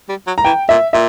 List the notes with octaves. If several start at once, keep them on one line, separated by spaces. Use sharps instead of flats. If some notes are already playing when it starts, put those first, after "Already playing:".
G3
F#3
A#5
E3 G5
A#2 E5
A#2 E5